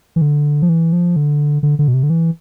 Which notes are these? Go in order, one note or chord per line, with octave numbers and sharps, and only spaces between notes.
E3
D3
F3
E3
F3
D3
D3
D3
B2
C3
D3
E3